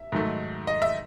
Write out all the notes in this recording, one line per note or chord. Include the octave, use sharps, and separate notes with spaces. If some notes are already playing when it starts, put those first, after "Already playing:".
Already playing: E5
G#2 D#3 F#3 A3
D#5
E5